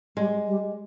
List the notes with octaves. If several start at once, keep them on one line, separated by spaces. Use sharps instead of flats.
G3 G#3
G3